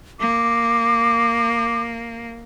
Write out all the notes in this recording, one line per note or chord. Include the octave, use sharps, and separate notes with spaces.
A#3 D6